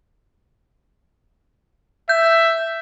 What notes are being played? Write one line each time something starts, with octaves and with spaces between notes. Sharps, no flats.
E5 G6